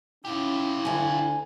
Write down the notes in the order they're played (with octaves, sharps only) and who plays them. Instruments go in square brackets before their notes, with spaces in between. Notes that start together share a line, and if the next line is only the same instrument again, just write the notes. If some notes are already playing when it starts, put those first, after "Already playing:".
[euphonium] C#4 [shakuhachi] E4 [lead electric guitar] F4 G4
[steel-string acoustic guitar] D2 G#5 [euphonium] D3